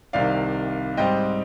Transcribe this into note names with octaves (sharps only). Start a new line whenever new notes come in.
C2 C3 D#3 D5 F5
G#2 G3 C4 D#5 G5